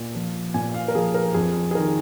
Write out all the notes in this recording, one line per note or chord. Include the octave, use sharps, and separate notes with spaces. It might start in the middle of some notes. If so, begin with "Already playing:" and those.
Already playing: A#2
F3
A#2 G#5
F5
A#4
F3 G#4
A#4
F2 G#4
G#4
D#3 A#4